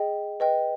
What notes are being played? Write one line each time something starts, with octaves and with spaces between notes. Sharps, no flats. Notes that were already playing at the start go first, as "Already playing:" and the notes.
Already playing: G#4 D#5 G5
B4 D#5 G5